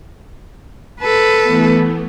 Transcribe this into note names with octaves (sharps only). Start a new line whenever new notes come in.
A4 B4
E3 A3 B3